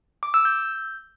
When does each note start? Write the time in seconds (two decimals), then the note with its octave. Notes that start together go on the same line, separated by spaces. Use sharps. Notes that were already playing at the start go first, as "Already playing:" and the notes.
0.23 D6
0.34 E6
0.45 G6